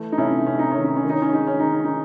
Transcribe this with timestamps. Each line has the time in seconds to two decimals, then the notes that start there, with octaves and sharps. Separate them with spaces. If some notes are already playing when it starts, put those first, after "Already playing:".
Already playing: E3 A3
0.12 D#4
0.17 C3 C#4 E4
0.46 C3 C#4
0.59 D#4
0.72 D#3 C#4
0.84 D#4
0.96 C#4
1.04 D#3
1.09 D#4
1.22 C#4
1.33 G#3 D#4
1.47 C#4
1.59 D#3 D#4
1.72 C#4
1.85 D#4